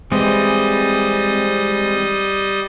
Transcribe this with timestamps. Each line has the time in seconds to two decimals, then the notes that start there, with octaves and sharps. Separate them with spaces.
0.12 E3 G3 G#3 C4 D#5